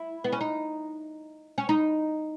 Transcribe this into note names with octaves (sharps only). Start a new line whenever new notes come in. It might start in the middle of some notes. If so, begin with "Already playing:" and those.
Already playing: E4
B3
C#4
D#4
C#4
D#4